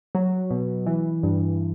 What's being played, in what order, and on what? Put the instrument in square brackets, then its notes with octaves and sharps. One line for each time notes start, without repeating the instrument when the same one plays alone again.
[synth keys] F#3
B2
E3
G2